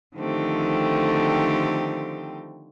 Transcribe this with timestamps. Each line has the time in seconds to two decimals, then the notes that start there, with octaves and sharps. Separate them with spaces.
0.17 D3 D#3 F3 A3 C4 G4